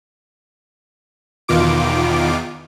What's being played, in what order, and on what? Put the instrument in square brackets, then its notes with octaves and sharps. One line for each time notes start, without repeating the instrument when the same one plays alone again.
[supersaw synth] E2 B2 D#3 F4 D6 D7